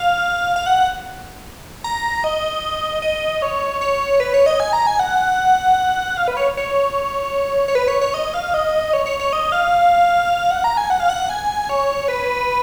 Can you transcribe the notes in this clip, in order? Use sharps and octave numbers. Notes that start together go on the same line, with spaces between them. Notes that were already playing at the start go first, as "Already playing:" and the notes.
Already playing: F5
F5
F#5
A#5
D#5
D#5
C#5
C#5
B4
C#5
D#5
G#5
A#5
G#5
F#5
F5
B4
C#5
C#5
C#5
B4
C#5
C#5
D#5
F5
D#5
C#5
C#5
C#5
D#5
F5
F#5
A#5
G#5
F#5
F5
F#5
G#5
C#5
B4